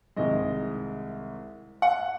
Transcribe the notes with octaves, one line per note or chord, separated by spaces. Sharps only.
C2 C3 D#3 G#3 D#5
F#5